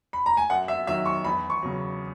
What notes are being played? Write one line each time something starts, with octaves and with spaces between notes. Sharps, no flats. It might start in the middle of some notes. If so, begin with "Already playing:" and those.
B5
A#5
G#5
F#2 F#5
E5
D#3 F#3 E5
C#6
E2 B5
C#6
C#3 F#3